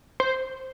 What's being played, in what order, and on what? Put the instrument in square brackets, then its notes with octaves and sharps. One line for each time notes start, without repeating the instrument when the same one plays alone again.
[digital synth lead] C5